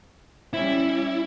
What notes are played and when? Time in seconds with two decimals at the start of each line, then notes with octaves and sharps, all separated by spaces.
0.53 G3 C#4 E4